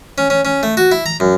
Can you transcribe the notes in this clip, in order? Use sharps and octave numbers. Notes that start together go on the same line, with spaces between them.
C#4
C#4
C#4
A3
F#4
E4
A#5
F#2